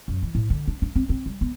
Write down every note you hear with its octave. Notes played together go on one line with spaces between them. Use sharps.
F#2
E3
A2
D3
D4
D4
C4
C4
G3
B3